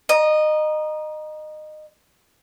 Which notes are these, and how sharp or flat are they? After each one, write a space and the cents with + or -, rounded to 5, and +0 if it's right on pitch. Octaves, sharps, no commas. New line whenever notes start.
D#5 -20 A#5 +20